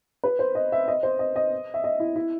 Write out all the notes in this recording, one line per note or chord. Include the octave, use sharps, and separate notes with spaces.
B4
C5
D#5
E5
D#5
C5
D#5
D#5
E5
D#5
E4
E4